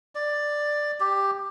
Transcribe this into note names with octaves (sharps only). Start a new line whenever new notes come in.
D5
G4